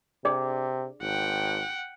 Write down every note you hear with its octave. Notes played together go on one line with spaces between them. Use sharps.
C3 D4 G#4 D5
G#1 F#5 G5